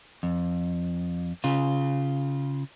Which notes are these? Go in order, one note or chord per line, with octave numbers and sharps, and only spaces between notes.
F2
C#3 F4